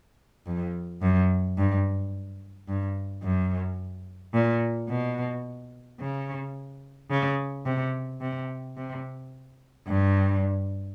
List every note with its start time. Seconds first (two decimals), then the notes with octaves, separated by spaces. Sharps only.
0.46 F2
1.02 F#2
1.58 G2
2.68 G2
3.23 F#2
4.34 A#2
4.89 B2
6.00 C#3
7.10 C#3
7.66 C3
8.21 C3
8.77 C3
9.87 G2